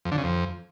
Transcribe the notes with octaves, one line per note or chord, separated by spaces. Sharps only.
F2
D3
C#3
F2